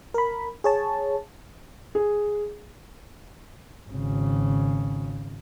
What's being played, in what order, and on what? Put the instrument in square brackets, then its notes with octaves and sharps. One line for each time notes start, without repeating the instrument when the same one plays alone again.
[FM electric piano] A#4 B5
G#4 C#5 A5
[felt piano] G#4
[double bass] G#1 C#3